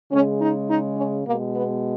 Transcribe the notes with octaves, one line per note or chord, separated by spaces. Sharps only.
C#3 G#3 C#4
D#4
D#4
C#4
B2 G#3 A#3
B3